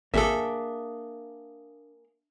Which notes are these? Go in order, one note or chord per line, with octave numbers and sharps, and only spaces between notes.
G#1 A#3 D4 G#4 A4 E5